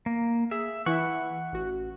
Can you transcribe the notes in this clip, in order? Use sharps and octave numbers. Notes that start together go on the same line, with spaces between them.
A#3
G#4 E5
E3 E4 E5 F#5 C#6
A1 F#4